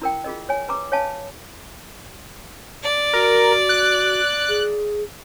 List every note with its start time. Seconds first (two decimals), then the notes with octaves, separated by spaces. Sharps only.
0.02 E4 A#4 G5
0.24 F4 G#4 A#4 D#5
0.49 C#5 G#5
0.68 B4 A#5 D6
0.92 C#5 D#5 F5 G#5 A5
2.83 D5
3.13 F#4 A#4
3.69 F#6
4.49 G#4